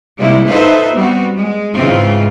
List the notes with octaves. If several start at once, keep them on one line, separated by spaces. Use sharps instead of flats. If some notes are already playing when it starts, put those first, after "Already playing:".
C3 G3 G#3 A#3 E4
D#4 F4 A4 B4 C5 E5
G3 B3 C4 F#4
G#3
G#2 C#3 E3 G#3 C4 F4